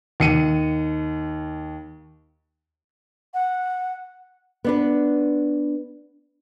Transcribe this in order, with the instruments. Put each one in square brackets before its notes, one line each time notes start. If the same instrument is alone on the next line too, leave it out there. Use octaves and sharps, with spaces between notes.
[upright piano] D#2 C#7 D#7
[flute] F#5
[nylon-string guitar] B3 D4 B4